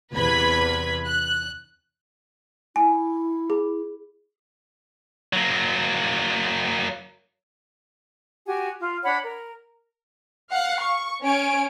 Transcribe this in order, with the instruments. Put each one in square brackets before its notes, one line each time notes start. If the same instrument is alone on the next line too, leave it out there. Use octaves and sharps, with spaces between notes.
[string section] E2 C3 B4 B5 G#6 B6
F#6
[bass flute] E4 [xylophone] G#5
[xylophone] G#4
[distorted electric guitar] F#3 A#3
[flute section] F#4 G4 G#5
F4
D4 C#5 F#5 B5
A#4
[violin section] F5 F#5
C#6
C#4 C#5 G#5 D7